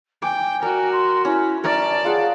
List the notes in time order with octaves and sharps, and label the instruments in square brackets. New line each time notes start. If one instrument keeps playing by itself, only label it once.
[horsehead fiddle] G5 [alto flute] G#5 [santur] D6
[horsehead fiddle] F#4 A#4 [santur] D5
[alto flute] C6
[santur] C#4 [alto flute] E4
[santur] A#4 C#6 [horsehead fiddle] D5 A5 [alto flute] E5
[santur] F4 F#5 [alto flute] G#4